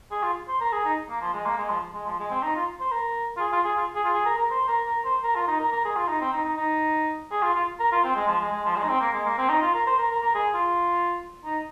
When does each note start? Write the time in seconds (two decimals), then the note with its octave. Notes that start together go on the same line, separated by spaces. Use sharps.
0.11 G#4
0.23 F4
0.48 C5
0.60 A#4
0.72 G#4
0.85 D#4
1.09 A#3
1.22 F3
1.34 G#3
1.45 A#3
1.58 G#3
1.70 F3
1.94 G#3
2.06 F3
2.19 G#3
2.31 C4
2.43 D#4
2.56 F4
2.80 C5
2.92 A#4
3.37 F4
3.40 G#4
3.52 F4
3.65 G#4
3.77 F4
3.96 G#4
4.05 F4
4.14 G#4
4.25 A#4
4.38 A#4
4.51 C5
4.68 A#4
4.87 A#4
5.05 C5
5.24 A#4
5.36 F4
5.48 D#4
5.60 A#4
5.71 A#4
5.85 G#4
5.96 F4
6.08 D#4
6.21 C4
6.33 D#4
6.45 D#4
6.57 D#4
7.32 G#4
7.43 F4
7.55 F4
7.80 A#4
7.92 F4
8.04 C4
8.15 G#3
8.27 F3
8.41 G#3
8.52 G#3
8.65 F3
8.76 G#3
8.83 D#4
8.89 C4
9.01 A#3
9.14 G#3
9.26 A#3
9.38 C4
9.49 D#4
9.62 F4
9.74 A#4
9.87 C5
9.99 A#4
10.11 A#4
10.22 A#4
10.35 G#4
10.54 F4
11.45 D#4